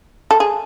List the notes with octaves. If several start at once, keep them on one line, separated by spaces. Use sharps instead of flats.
A4
G#4